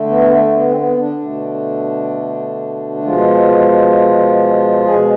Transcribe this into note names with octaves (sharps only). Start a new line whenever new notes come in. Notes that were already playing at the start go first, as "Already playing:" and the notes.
Already playing: D3 A3
B3
A3
B3
C4
B3
D3 D4
B2 A3
B2 F3 G#3 F4
B2 G#3 G#4